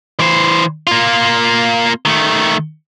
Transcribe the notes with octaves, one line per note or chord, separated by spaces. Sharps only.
E3 C5
A#3 F4
D#3 A3